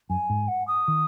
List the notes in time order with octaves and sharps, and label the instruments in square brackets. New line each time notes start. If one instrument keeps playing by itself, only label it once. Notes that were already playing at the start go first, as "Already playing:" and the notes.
[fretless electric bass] F#2 [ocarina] G#5
[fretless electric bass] G#2
[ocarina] F#5
D#6
[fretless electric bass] D#3